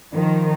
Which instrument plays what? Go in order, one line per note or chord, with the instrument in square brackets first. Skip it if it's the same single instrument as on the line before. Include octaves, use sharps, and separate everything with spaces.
[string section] D#3 F3